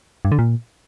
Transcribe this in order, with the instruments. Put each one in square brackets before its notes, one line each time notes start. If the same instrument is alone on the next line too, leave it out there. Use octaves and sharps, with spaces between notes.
[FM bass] G2
D3
A#2